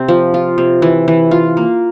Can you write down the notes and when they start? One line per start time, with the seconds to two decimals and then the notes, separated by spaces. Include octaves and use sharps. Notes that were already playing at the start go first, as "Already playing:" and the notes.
Already playing: C3 C4
0.08 F3
0.34 F4
0.58 C3
0.82 E3
1.08 E3
1.31 F4
1.57 A#3